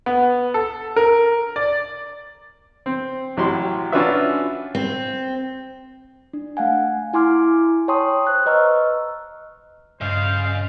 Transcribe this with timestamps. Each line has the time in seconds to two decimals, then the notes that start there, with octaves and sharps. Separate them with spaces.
0.06 B3
0.54 A4
0.96 A#4
1.56 D5
2.86 C4
3.37 A1 F#3 E4 G4 C6
3.92 C#4 D4 F4 F#4 B4 E5
4.75 C4
6.33 D4
6.57 A3 F5 F#5 G#5
7.13 E4 G#5 C6 D6 F6
7.88 C#5 G5 A5 C6 C#6 D#6
8.27 C5 F#6
8.46 B4 D#5 A#5 C#6 E6 F6
10.01 G2 C#3 C5 D#5 F5 A6